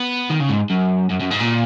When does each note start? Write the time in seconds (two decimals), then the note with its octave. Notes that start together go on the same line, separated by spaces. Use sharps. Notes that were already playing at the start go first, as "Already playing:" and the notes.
Already playing: B3
0.30 D#3
0.41 C#3
0.50 G#2
0.70 F#2
1.10 F#2
1.20 F#2
1.30 G#2
1.40 A#2